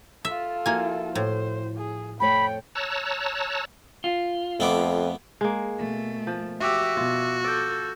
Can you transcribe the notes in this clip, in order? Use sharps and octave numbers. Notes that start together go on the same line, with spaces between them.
F4 A4 E5
F3 A#3 E4 F#4 G#5
A2 C5
G#4
F2 A3 C#5 G5 B5
C#5 A5 A#5 E6 F#6
F4
F2 A3 B3 D6
G#3 A#3
B2 A3
F3
F#4 G4 E5 D6 E6
B2 F4
A4 D5 E6 G6